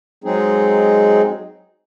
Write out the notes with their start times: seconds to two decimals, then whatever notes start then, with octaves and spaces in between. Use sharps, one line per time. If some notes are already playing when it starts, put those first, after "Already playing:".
0.24 F#3 G#3 C4 D#4 G#4